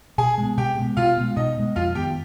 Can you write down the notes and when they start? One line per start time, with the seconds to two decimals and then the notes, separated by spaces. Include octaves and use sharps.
0.18 B2 G#4 G#5
0.38 G#3 B3
0.57 B2 G4 G5
0.78 G#3 B3
0.97 B2 F4 F5
1.17 G#3 B3
1.36 B2 D#4 D#5
1.57 G#3 B3
1.76 F2 F4 F5
1.95 D#3 B3 G4 G5